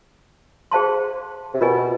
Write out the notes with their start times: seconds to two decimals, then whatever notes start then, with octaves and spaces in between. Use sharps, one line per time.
0.71 G#4 C5 F5 A5 C6
1.54 C3
1.61 B2 F4 A#4 D#5 G#5